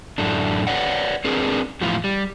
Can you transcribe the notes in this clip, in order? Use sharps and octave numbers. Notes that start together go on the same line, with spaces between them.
F#2 A2 A3 D4
B4 C#5 D5 F#5
C4 D4 G#4 A#4 B4
E2 A2 F3 E4 F4
G3